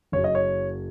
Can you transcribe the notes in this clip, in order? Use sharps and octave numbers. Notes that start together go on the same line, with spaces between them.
F#1 F#2 F#3 C#5
D#5
C#5